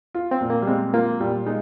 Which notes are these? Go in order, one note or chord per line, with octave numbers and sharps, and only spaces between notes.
F4
C4
A#2
A#3
G3
G#3 C4
A#3 F4
A#2 G3
G#3 D#4